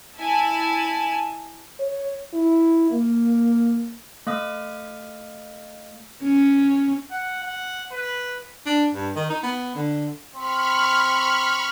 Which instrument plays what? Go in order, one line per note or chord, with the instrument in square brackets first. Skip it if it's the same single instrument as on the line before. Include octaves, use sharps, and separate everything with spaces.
[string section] E4 G#5 A5
[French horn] C#5
E4
A#3
[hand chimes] A3 F5 D#6
[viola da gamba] C#4
[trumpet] F#5
F#5
B4
[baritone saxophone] D4
G2
D#3
D#4
B3
D3
[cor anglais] C4 [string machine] B5 C#6 F6